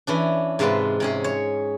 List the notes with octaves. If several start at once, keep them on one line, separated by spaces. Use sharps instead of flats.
E3 C#4 D4
G#2 C3 G#3 F4 B4 A5
C3 C#4 G#4
C#5